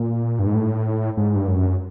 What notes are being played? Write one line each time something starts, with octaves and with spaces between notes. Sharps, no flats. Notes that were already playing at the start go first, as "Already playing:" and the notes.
Already playing: A#2
G2
G#2
A2
G#2
G2
F#2